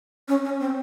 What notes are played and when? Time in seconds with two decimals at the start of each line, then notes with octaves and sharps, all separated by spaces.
0.28 C#4
0.45 C#4
0.60 C4